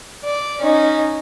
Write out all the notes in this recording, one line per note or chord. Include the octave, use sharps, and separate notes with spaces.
D5
C#4 D#4